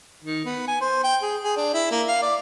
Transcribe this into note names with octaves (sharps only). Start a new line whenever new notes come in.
D#3
B3
G#5
C5
G5
G#4
G#4
D4
E4
A#3
F5
D5